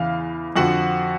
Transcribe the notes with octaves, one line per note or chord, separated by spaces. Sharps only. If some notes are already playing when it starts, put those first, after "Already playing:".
Already playing: E2 C#3 E3 F5
F2 D3 F3 F#4 F#5